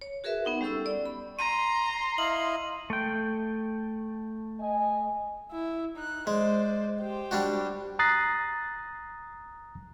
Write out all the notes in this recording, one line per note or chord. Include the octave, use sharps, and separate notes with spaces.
C#5
F#4 G#4 A#4 B4 E5
B3 D#4 F#5 C6
G3 C#4 G4 A4 C#6 E6
D5
B5
A#5 C6 D#7
E4 D#5 F5 F#7
A3 G5
D#5 G#5
E4
D#4 F#6
G#3 C5 D5
G4 C5
G3 D4 F#4
A#5 D#6 F#6 A6 A#6 C7